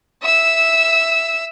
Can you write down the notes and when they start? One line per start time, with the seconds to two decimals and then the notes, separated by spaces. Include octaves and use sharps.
0.22 E5 E6